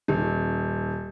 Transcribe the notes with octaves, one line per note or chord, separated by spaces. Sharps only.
D#1